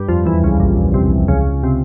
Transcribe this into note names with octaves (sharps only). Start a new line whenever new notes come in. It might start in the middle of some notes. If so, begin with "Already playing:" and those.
Already playing: G2 G3
F2 F3
E2 E3
C#2 C#3
A#1 A#2
C2 C3
C#2 C#3
C3